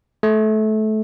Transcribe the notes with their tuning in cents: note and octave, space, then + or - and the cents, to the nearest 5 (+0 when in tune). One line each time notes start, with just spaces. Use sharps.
A3 -25